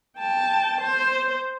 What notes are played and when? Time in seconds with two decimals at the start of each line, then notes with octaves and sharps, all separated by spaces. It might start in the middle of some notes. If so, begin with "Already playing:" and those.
0.18 G5 A5
0.81 C5